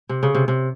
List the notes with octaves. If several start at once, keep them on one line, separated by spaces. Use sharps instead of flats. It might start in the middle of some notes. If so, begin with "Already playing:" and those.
C3
C#3
C3
C3